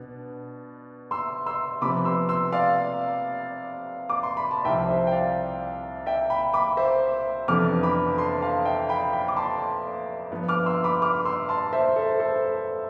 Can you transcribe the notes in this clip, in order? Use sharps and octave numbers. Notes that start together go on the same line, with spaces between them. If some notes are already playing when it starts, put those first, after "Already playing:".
Already playing: B2 B3 D4
C6 E6
C6 E6
C3 F3 B3 B5 D6
C6 E6
C6 E6
D5 F5
D6
C6
B5
A5
C2 C3 F3 E5 G5
C5 E5
G5
D5 F5
E5 G5
G5 B5
B5 D6
C5 E5
F2 C3 E3 B3 D4 D6 F6
B5 D6
A5 C6
F5 A5
E5 G5
G5 B5
G5 B5
D6
A5 C6
G2 F3 B3
D6 F6
C6 E6
B5 D6
D6 F6
C6 E6
A5 C6
C5 E5
A4 C5
A4 C5